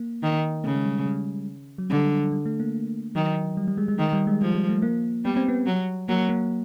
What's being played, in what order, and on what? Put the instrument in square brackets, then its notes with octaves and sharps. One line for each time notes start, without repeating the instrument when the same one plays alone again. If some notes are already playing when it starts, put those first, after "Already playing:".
Already playing: [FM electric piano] A#3
[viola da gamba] D#3
[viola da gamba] C#3 [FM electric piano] A3
[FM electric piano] G#3
G3
G3
F#3
[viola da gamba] D3 [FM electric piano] G3
[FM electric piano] G3
A3
A#3
[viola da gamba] D#3 [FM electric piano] F#3
[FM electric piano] G3
G3
G#3
G#3
[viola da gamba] D#3 [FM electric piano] G#3
[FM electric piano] G3
G#3
[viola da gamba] F3 [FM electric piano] G3
[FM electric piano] G3
A3
A#3
[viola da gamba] G3 [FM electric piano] B3
[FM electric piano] C4
B3
[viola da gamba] F#3
[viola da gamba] F#3 [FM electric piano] A#3
[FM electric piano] A#3